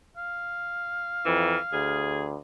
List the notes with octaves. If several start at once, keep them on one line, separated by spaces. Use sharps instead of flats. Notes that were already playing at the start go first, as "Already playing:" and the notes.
F5
F2 E3
D2 G#4